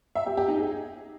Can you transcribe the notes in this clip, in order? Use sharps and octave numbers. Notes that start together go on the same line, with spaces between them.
E5
G4
G4
D#4
G#4